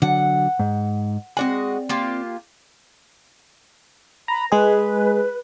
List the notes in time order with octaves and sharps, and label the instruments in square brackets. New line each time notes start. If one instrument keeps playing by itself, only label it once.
[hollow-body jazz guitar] D3 F#3 [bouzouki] F#5
[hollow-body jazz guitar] G#2
[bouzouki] G#3 F#4 D#5 [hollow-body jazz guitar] C4 D5 G#5
[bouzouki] A#3 F4 G4
[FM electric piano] A#5 [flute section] B5
[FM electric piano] G#3 G#4 [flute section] B4